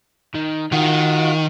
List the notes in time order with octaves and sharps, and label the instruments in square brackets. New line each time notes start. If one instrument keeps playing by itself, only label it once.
[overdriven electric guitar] D#3
[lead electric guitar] D#3 [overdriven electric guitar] F4 F#4